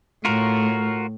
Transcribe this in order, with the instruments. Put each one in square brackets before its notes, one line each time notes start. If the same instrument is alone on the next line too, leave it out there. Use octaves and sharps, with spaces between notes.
[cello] A2 [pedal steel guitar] F4 F#4 A#4